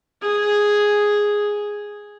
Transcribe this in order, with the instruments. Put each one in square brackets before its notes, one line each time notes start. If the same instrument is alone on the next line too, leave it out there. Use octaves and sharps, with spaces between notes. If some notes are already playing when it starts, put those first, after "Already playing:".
[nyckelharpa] G#4